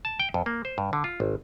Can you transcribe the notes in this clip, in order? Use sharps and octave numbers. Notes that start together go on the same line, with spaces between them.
A5
G5
F2
A#3
C5
G2
D3
F4
G#1